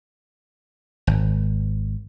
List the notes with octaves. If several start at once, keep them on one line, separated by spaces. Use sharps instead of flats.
G#1